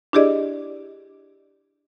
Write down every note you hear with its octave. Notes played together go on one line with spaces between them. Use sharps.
D4 E4 G4 G#4 D5 D#5